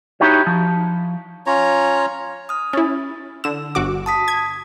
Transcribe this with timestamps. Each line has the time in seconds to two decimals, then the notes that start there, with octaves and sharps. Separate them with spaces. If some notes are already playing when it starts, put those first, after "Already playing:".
0.20 D#4 E4 F#4 G4 C#5
0.47 F3
1.46 C#4 F4 C#5 A#5
2.49 D#6 F6
2.73 C#4 E4 A6
3.44 D3 E6 E7
3.75 G1 F#4 D6
4.06 A5 D#6 B6
4.28 G#6